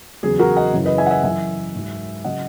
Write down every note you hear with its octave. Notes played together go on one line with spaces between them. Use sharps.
E2 C#3 F#3 G#4
F#4 A#4
D#5 F#5
F#2 C#3 E3
B4 D#5
E5 G#5
F#5
E5 G#5
F#2 E3 E5 G#5
G#2 F#3
C#3 F#3 D#5 F#5